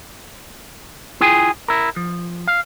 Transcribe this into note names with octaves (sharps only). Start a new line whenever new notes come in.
E4 F4 G#4 G5 G#5
E4 A#4
F3
F5